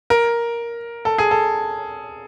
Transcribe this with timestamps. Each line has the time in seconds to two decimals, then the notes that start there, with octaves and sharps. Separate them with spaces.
0.10 A#4
1.05 A4
1.18 G#4
1.31 A4